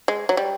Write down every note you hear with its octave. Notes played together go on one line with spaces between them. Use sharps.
G#3
F#3
G3